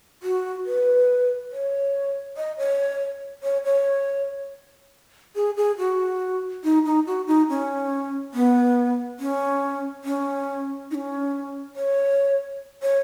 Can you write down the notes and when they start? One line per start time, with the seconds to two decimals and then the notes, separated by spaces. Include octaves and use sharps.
0.23 F#4
0.66 B4
1.52 C#5
2.37 D#5
2.58 C#5
3.43 C#5
3.64 C#5
5.35 G#4
5.57 G#4
5.78 F#4
6.64 D#4
6.85 D#4
7.07 F#4
7.27 D#4
7.49 C#4
8.34 B3
9.20 C#4
10.04 C#4
10.91 D#4
10.95 C#4
11.75 C#5
12.82 C#5